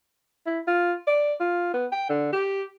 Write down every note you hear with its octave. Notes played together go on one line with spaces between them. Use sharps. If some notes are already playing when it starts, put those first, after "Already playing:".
E4
F4
D5
F4
B3
G5
D3
G4